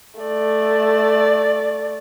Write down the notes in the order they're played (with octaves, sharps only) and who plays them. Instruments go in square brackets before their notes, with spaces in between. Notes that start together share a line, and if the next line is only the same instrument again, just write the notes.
[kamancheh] A3 D5